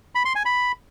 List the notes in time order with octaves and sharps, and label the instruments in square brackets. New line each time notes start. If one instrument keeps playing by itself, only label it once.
[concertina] B5
C6
G#5
B5